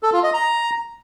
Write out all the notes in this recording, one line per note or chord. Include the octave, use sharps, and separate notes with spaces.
A4
F4
D#5
A#5